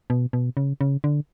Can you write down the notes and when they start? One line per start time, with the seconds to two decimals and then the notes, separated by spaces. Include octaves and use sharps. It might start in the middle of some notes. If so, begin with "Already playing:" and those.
0.10 B2
0.33 B2
0.57 C#3
0.81 C#3
1.04 D3